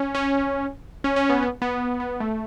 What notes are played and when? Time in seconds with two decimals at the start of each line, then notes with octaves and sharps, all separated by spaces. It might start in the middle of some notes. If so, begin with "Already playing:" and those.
Already playing: C#4
0.15 C#4
1.04 C#4
1.16 C#4
1.29 B3
1.43 B3
1.62 B3
2.00 B3
2.20 A3